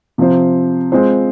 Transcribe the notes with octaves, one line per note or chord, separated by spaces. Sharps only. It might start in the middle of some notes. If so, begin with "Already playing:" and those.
C3 F3 C4 F4 C5
G#3 C4 F4 C5